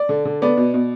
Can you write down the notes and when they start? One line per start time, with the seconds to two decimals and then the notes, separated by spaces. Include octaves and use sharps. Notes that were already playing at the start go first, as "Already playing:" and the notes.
Already playing: D5
0.09 D3
0.25 D3
0.42 B3 D5
0.57 B2
0.74 B2